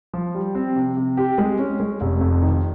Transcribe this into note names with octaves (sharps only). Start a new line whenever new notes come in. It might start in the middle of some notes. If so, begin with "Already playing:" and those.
F3
G3
C4
C3
C3
G4
G#3
C#4
G#3
F1
F2
D#3